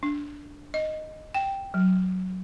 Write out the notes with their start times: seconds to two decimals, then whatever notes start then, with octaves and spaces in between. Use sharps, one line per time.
0.03 D4
0.74 D#5
1.35 G5
1.74 F#3